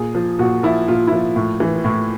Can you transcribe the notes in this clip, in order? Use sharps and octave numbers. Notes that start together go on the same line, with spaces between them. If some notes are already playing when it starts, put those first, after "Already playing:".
Already playing: A#2 G#4
F3
A#2 F#4
F3 E4
A#2 F4
E4
F3 F4
A2
E3
A2